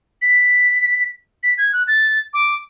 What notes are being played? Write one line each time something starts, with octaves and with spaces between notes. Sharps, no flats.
B6
B6
G#6
F#6
A6
D6